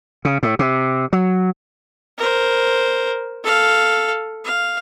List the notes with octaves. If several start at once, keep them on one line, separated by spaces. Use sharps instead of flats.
C#3
A2
C3
F#3
A#4 C5
A4 F5
F5